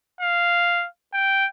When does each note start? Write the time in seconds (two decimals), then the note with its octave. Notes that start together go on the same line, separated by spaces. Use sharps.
0.21 F5
1.13 G5